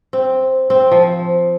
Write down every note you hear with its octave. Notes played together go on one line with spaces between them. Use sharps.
C4
C4
F3